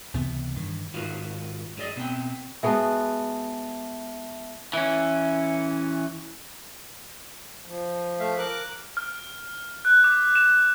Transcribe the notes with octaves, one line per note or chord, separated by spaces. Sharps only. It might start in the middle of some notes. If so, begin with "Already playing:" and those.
C#2 C3 E3 B3
G2 D#3 E3
G#2 D#3 F4 F#4 B4 F5
G2 F#3 G#4 D5 D#5
B2 B3 C4 G5
G#3 B3 F#4 E5 A5
E3 C#4
F3
A3 E5 F5
A#4 D6 F#6
F6
F#6
D6
E7